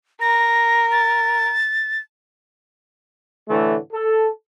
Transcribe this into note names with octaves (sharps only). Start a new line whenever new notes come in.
A#4 A#6
A6
A2 D3 E3 A3
A4